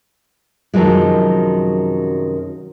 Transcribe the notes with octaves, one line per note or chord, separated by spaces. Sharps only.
F#2 C3 D#3 F3 F#3 G#3